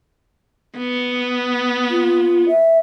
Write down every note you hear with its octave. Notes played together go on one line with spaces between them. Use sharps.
B3
F4
E5